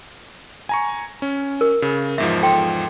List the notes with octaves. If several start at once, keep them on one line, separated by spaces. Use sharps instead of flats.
G#5 A#5 C#6
C#4
A#4
C#3
E2 G#2 F3 E5
A4 G5 C6